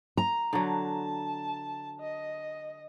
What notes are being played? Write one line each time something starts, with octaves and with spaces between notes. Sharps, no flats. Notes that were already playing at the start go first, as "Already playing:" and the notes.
A#5
D3 F#3 A5
D#5